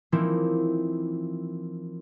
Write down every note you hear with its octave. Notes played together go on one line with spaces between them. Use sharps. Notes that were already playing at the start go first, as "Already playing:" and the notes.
E3 F3 A#3 C4 D#4 E4